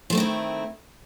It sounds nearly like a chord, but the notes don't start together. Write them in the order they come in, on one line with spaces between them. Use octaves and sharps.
F3 A3 C4 D#3 E4